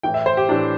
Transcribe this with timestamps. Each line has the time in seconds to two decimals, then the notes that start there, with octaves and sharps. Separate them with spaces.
0.03 A2 E3 G5
0.14 E5
0.26 C5
0.37 G4
0.49 A2 E3 D4